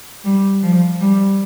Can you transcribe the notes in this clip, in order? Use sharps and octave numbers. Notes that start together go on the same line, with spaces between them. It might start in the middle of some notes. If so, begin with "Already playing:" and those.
G3
F3
G3